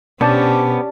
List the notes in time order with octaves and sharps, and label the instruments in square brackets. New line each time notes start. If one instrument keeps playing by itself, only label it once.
[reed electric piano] B2 [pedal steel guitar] B3 C5 A5 [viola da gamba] C#4 G4 [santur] D4